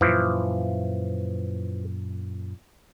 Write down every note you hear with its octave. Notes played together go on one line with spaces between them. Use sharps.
F#2 A#2 E3 F3